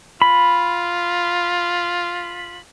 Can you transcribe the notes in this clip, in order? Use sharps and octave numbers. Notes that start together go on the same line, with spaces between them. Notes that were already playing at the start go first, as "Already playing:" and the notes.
F4 B5